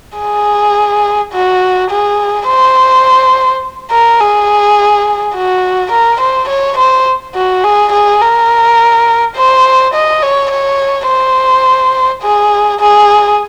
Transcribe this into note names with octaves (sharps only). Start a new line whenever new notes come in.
G#4
F#4
G#4
C5
A#4
G#4
F#4
A#4
C5
C#5
C5
F#4
G#4
G#4
A#4
C5
D#5
C#5
C#5
C5
G#4
G#4